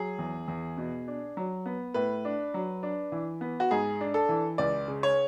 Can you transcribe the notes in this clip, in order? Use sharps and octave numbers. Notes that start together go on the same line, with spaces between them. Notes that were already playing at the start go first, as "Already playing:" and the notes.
Already playing: F#3 G#4
E2
E2
B2
D4
F#3
B3
A2 B4
D4
F#3
D4
E3
B3
F#4
G#2 G#4
D4
A4
E3
C#2 D5
C#3
C#5